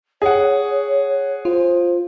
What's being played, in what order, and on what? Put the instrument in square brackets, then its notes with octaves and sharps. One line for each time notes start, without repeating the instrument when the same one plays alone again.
[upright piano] G#4 F#5 [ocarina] C#5
[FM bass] F4 [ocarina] C5